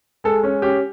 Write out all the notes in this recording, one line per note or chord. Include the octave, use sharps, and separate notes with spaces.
G#3 A4
C#4
C#4 G4